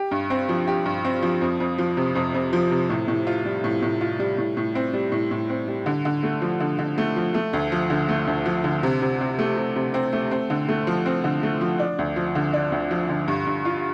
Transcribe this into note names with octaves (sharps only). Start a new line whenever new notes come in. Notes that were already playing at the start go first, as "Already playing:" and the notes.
Already playing: G4
G2
C4
F3
G4
G2
C4
F3
F2
F2
F3
C3
F2
F2
F3
C3
A2
A2
F4
G3
A2
A2
F4
G3
A2
A2
C4
G3
A2
A2
C4
G3
D3
D3
A3
F3
D3
D3
A3
F3
A3
D2
F3
D3
A3
D2
F3
D3
C3
C3
C4
A3
C3
C3
C4
A3
C4
D3
A3
F3
C4
D3
A3
F3
D4
D2
F3
D3
D4
D2
F3
D3
G2
G2
F4